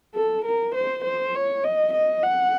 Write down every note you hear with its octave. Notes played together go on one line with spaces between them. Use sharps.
A4
A#4
C5
C5
C#5
D#5
D#5
F#5